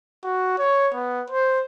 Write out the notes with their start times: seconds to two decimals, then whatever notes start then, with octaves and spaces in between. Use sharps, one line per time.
0.24 F#4
0.58 C#5
0.94 B3
1.30 C5